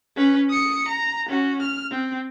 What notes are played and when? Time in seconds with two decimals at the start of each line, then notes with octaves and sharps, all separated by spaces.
0.16 C#4 B4
0.49 D#6 C#7
0.88 A#5
1.29 C#4 F#4
1.62 F6
1.91 C4